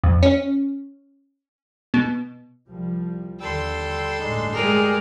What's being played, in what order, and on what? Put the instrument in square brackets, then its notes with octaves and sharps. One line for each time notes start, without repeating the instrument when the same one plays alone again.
[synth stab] F2
C#4
B2
[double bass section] C2 F3 G3
[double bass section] D#2 D3 [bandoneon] G3 G5 E6 [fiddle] A4 C6
[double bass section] G1 A2 [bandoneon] G#3 D4 D#4
[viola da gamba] G#3 A#4 [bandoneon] G4 G#4 D5